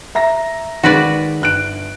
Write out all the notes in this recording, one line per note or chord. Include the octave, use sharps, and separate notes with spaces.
E5 A#5 A#6
D#3 G#3 F#4 B4 D5
G1 F#6 D7